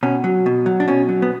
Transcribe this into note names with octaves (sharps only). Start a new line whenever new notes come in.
B2 C#4
F#3
B2
F#3
D4
B2 C#4
F#3
B3